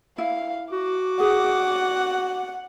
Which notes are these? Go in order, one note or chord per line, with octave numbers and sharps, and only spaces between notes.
E4 F5
F#4 D6
G#4 F#5